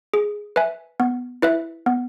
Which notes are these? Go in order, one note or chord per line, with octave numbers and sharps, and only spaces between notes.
G#4
B4 E5 G#5
B3
E4 B4 E5
B3